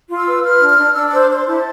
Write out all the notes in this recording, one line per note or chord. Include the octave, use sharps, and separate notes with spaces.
F4
E6
B4
B4 F6
D4
F6
D4
D4 E6
C5 E6
D6
C5 C6
E4 A5